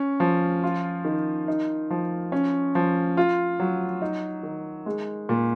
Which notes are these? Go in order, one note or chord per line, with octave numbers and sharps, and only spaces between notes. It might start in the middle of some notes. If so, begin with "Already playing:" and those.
Already playing: C#4
F3
F4
D#3
D#4
F3
C#4
F3
F4
F#3
D#4
D#3
G#3
A#2